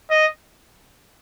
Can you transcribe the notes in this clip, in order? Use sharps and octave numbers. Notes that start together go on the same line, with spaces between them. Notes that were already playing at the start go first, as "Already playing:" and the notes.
D#5